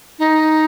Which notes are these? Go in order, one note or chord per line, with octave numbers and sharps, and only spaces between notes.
D#4